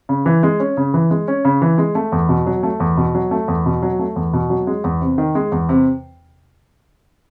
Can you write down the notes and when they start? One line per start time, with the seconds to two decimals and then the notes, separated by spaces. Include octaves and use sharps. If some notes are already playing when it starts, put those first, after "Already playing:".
0.09 C#3
0.26 E3
0.43 G#3
0.60 C#4
0.77 C#3
0.94 E3
1.11 G#3
1.28 C#4
1.45 C#3
1.62 E3
1.78 G#3
1.95 A3
2.12 E2
2.29 B2
2.46 F#3
2.63 A3
2.80 E2
2.97 B2
3.15 F#3
3.31 A3
3.48 E2
3.66 B2
3.82 F#3
3.99 A3
4.16 E2
4.33 B2
4.50 F#3
4.67 G#3
4.84 E2
5.01 C3
5.18 D#3
5.35 G#3
5.52 E2
5.69 C3